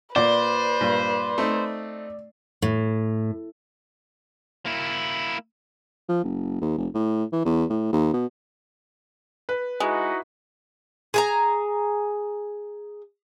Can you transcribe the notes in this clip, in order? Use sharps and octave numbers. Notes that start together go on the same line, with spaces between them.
A#2 B4 C5 D5
G2 A#2
A3 C4 D#4
A2
A#3 E4
F3
F#1
D#2
F1
A2
E3
E2
A2
D#2
B2
B4
G#3 D#4 E4 F#4
G#4 G#5 A#5